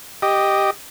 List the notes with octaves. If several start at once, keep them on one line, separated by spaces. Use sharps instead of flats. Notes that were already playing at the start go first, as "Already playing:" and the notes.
G4 D#5